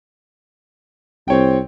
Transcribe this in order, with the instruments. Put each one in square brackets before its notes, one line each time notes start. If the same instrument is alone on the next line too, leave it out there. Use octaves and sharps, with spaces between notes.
[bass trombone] C2 [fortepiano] C4 C#5 G5